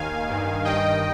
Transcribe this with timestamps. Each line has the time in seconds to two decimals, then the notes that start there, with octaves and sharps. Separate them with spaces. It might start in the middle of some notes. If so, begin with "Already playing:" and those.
Already playing: D#2 D#3 F5 G#5
0.29 G2 D#3
0.65 G2 D#3 D#5 G5